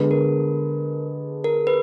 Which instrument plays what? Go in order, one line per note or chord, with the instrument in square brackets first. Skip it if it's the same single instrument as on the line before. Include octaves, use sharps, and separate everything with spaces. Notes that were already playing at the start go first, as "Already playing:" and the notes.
Already playing: [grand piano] D3 G#3 B3 D4 G#4
[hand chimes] A#4
A#4
B4